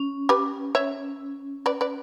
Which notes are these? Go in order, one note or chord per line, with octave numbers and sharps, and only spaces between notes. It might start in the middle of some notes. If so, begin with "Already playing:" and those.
Already playing: C#4
G4 B4
C#5 E5
B4 D5
B4 D5